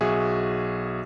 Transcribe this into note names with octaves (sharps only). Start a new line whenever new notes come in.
B1 F#4 G#4 E5